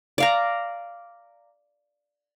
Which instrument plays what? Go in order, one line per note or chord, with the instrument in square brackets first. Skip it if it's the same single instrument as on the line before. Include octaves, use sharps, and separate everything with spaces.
[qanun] D5 F5 A#5